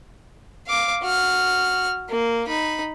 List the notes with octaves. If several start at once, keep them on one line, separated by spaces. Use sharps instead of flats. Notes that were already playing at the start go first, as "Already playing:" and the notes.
F5 D6
F#4 F6
A#3
D#4 B5